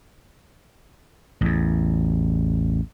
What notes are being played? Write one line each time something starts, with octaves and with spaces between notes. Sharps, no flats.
A1 E2